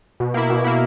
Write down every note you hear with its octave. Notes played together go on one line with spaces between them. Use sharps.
B2
A#3 E4
B2
A#3 E4